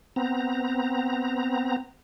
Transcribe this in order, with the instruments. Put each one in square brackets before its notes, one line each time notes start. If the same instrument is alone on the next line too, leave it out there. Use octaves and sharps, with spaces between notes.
[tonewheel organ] B3 C4 A#5